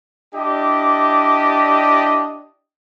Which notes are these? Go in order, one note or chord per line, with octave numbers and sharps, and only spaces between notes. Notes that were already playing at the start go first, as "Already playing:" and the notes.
D4 E4 G4 D5 D#5